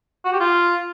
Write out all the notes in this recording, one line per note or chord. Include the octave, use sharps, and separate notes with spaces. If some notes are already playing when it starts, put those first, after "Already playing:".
F#4
G4
F4